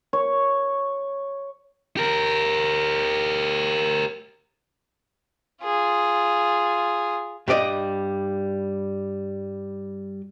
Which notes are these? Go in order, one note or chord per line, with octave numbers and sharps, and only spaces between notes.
C#5
G4 A#4
F4 G#4
G2 G3 G4 D5 D#5